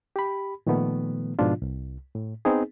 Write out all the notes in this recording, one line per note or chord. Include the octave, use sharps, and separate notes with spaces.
G4 B5
A#2 D#3 F3 A3 B3
G#2 B2 F3 D4 F4
C2
A2
B3 C4 D#4 G#4